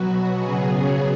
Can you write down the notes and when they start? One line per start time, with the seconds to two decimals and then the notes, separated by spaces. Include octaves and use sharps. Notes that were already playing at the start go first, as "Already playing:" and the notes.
Already playing: B2 F#3 B3 F#4
0.38 C#3 F#3 B3 G#4